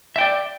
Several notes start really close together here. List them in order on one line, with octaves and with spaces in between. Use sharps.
E5 G5 D5